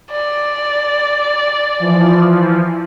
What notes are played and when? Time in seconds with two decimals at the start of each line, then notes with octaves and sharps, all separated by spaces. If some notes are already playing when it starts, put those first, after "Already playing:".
0.12 D5
1.79 E3 F3